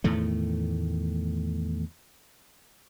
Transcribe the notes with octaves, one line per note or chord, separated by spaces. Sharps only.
E2 A2 D#3 A3